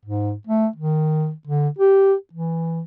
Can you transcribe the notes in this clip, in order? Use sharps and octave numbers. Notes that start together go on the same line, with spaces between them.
G#2
A3
D#3
D3
G4
E3